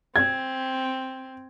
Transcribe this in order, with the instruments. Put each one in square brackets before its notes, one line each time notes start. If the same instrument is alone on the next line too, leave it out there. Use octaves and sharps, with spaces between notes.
[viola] C4 [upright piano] G#6